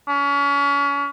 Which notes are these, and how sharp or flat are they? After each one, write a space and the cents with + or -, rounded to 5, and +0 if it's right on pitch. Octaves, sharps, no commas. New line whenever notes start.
C#4 +35